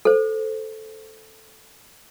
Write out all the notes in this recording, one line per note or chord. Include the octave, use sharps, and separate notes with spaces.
A4 C5